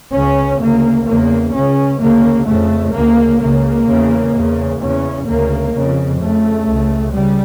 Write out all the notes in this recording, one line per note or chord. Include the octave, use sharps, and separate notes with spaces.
C#2 C#3 C#4
D2 C#3 A#3
E2 C#3 A#3
C#2 C#3 C#4
D2 C#3 A#3
F2 C#3 A3
D2 C#3 A#3
C#2 C#3 A#3
E2 C#3
E2 C#3
E2 C#3 C#4
D2 C#3 A#3
F2 C#3
F2 C#3 A3
C#2 C#3
C#3 G3